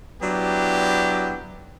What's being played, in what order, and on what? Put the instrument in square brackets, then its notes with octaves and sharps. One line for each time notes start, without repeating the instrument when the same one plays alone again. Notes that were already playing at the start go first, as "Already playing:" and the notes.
[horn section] F#3 B3 D4 E4 G4